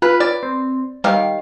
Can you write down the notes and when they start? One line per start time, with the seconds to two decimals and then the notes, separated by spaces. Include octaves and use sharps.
0.02 F4 B4
0.20 D5
0.43 C4
1.04 D#3 G3 G4 F5